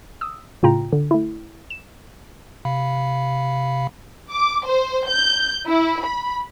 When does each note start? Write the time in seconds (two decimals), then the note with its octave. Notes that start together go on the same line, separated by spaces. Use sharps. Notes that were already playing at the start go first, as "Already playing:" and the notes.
0.21 D#6 E6
0.63 A2 C#3 F4 G5 A#5
0.92 D3
1.11 A3 E4
1.70 E7
2.65 C3 F5 B5
4.31 D6
4.66 C5
5.08 G6
5.67 E4
6.01 B5